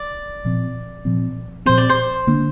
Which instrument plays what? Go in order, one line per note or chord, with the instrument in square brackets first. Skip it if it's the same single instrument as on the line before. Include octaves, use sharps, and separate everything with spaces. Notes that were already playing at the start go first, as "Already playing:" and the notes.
Already playing: [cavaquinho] D5
[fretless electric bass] A#2 F3 C4
A#2 F3 C4
[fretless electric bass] A#2 F3 C4 [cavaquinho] C5
[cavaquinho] D5
C5
[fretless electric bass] D3 A#3 D4